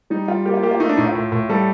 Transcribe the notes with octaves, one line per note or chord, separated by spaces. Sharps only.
G3 D#4
G3 F4
A#3 G4
F4
A#3 G4
F4
A3 D#4
D4
A2 D#4
F4
A2
A2
G3 A4